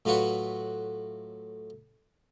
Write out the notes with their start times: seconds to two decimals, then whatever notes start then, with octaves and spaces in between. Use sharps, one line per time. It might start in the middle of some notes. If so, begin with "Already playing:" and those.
0.05 A2 F#3 F4 F#4 B4 F#5